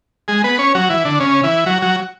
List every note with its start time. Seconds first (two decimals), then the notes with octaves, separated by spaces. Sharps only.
0.28 G#3 G#4
0.44 B3 B4
0.59 C#4 C#5
0.75 F#3 F#4
0.89 E3 E4
1.05 D3 D4
1.20 C#3 C#4
1.43 E3 E4
1.66 F#3 F#4
1.82 F#3 F#4